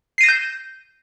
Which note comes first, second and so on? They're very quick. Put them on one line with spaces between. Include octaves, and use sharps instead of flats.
C7 D#7 A#6 E7 G6